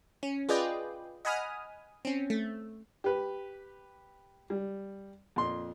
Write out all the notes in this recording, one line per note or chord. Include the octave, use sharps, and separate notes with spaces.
C#4
F4 G#4 B4 D5 D#5 G5
D#5 F#5 G#5 B5 D#6 F6
C4 C#4
A3
G4 B4
G3
F2 A#2 C6